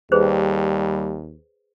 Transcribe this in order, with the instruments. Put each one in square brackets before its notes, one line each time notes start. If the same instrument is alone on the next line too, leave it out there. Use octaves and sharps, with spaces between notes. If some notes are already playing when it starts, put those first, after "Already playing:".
[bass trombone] D#2 [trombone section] G3 [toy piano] G#4 B4 C5